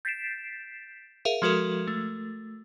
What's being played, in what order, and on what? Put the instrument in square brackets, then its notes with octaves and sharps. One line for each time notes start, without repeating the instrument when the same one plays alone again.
[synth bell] G6 A6 B6 C7 D7 E7
G#4 A#4 E5 F5
F3 G#3 F#4 A4 A#4
A3